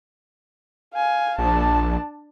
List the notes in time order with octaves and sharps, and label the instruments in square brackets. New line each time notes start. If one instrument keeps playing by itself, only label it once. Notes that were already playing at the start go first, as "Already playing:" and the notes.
[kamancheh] F5 G#5
[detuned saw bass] A#1 [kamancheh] D4 A5